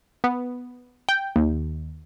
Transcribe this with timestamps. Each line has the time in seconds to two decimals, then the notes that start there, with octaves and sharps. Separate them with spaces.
0.24 B3
1.09 G5
1.36 D#2